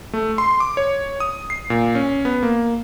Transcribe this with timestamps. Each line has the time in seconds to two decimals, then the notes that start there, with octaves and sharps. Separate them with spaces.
0.13 A3
0.38 C6
0.60 D6
0.77 C#5
1.20 D#6
1.50 C7
1.70 A#2
1.95 C#4
2.25 B3
2.43 A#3